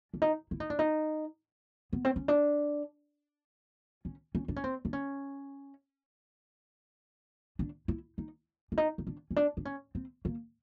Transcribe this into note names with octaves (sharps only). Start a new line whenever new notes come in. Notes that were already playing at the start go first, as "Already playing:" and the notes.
D4
D#4
E4
D#4
D4
D#4
B3
C4
C#4
D4
C#4
C#4
D4
C#4
C4
D4
C#4
D4
E4
D#4
D4
D#4
D#4
D4
C#4
D4
D4
C#4
C4
A#3